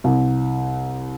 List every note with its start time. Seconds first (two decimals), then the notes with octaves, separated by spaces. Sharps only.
0.04 C2